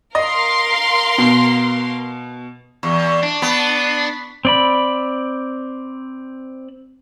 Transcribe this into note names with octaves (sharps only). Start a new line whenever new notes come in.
A#4 D#5 F5 C6
B2
E2
D4
B3
C4 D5 B5